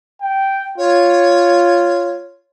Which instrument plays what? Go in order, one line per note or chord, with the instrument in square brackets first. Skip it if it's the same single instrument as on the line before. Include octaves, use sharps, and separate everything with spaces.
[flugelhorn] G5
[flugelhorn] F4 [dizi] C#5